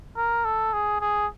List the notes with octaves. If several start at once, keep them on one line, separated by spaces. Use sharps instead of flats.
A#4
A4
G#4
G#4